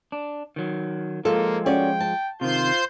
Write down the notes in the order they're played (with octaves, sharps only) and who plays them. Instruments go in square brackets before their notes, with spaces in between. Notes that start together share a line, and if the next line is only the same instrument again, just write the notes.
[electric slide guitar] D4
D#3 F#3
[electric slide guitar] F3 G#3 F4 [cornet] A#3 [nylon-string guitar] A4
[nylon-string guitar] C#4 F#4 D5 [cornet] G5
[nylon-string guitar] A5
[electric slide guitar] C3 D#3 [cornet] F4 [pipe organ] C5 C6 G6